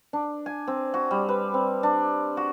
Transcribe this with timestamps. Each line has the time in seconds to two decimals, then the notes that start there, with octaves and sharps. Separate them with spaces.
0.13 D4
0.46 G#5
0.68 C4
0.94 F#4
1.11 G3
1.29 B4
1.54 C4
1.83 D4
2.37 F#4